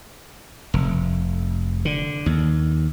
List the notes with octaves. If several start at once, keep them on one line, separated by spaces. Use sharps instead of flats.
F1
D3
D#2